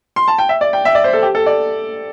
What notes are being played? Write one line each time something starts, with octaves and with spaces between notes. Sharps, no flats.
C6
A5
G5
E5
D5
G5
E5
D5
C5
A4
G4
A4
D5